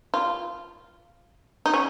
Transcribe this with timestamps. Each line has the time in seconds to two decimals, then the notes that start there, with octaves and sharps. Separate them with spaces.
0.14 F4
1.66 D#4
1.74 C#4